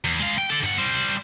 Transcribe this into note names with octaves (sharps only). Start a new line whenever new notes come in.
E2
G#3 F5
G5
A4 D5
G2 F#5
G3 C5